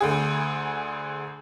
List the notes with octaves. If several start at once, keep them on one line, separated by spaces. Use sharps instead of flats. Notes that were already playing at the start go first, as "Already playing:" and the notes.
D2 D3 G#4